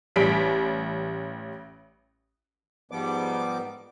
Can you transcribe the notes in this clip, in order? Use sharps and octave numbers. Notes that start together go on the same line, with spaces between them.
A1 G3 B6 D7
G#2 F3 G3 B3 D6